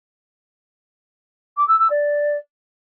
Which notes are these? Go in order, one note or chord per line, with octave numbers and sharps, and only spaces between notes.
D6
E6
E6
D5